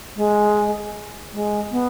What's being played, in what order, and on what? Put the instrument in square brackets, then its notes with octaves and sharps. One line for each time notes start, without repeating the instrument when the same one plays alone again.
[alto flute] G#3
G#3
B3